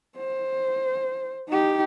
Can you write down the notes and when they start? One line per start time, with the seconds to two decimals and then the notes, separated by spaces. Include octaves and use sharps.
0.17 C5
1.48 D#4 G4